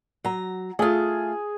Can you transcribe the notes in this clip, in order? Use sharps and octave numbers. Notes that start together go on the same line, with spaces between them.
F#3 A#5
A3 F4 G#4